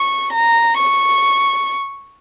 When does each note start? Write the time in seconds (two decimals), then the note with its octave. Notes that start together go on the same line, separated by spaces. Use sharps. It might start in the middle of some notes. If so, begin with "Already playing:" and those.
Already playing: C#6
0.33 A#5
0.78 C#6